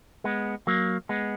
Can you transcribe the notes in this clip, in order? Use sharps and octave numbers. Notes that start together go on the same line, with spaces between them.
G#3 B3
F#3 A#3
G#3 B3